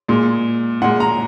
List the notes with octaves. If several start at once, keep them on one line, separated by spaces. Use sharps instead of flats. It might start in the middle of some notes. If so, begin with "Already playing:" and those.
A#2 G#3
A#2 G#3 F#5
A#5